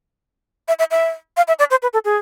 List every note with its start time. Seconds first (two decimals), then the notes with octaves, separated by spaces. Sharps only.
0.68 E5
0.79 E5
0.91 E5
1.37 F5
1.48 E5
1.59 D5
1.71 C5
1.82 B4
1.93 A4
2.05 G#4